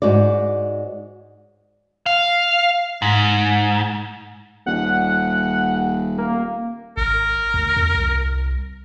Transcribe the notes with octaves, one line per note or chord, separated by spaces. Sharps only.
G#2 F#4 C#5 D5
F5
G#2
D#1 F#5
A#3
G#1 A#4
D2
E2
C2